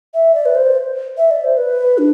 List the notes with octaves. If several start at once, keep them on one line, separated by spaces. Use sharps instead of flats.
E5
D5
B4
C5
E5
D5
C5
B4
D4